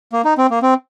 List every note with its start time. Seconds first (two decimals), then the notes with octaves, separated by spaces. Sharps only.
0.13 A#3
0.25 D#4
0.38 C4
0.50 A#3
0.62 C4